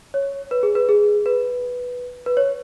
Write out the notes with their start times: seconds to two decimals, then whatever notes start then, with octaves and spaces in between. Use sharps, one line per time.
0.14 C#5
0.51 B4
0.63 G#4
0.75 B4
0.89 G#4
1.26 B4
2.26 B4
2.37 C#5